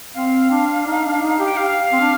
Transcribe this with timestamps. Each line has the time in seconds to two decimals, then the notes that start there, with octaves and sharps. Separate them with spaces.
0.14 C4 F5
0.50 D4
0.86 D#4
1.04 D4
1.22 D#4
1.39 G4
1.45 G5
1.57 F5
1.92 C4
2.01 D4